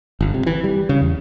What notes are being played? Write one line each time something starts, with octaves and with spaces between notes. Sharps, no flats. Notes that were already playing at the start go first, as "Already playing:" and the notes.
G1
C3
E3
G3
C#3
E2